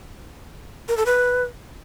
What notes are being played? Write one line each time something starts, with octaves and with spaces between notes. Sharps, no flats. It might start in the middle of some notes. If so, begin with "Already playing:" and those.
A#4
A4
B4